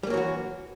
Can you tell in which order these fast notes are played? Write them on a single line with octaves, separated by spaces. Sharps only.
G3 A#3 F#3 E3 F#4